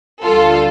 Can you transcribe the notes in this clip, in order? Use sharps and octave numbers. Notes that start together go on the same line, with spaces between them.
D2 D3 G3 F4 A4